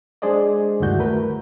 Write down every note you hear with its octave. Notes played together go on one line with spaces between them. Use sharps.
G#3 D4 G#4 C5 D5 D#5
D2 G2 D#3 E4 F#4 G6
A3 A#4 B4